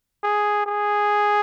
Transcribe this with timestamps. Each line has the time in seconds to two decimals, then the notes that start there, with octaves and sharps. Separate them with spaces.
0.23 G#4
0.66 G#4